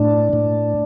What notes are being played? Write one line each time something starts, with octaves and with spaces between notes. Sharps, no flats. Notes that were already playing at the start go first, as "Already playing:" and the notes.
Already playing: A2 D4
A2